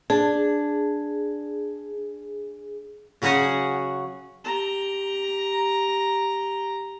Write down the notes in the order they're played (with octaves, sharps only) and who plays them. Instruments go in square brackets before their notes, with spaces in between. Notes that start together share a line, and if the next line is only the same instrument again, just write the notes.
[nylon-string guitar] D4 [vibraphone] G#4
[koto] C#3 F#3 C#4 F#4 G#4 F#5
[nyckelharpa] G4 A#5